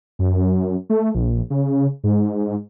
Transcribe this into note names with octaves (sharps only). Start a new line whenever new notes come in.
F#2
A3
A#1
C#3
G#2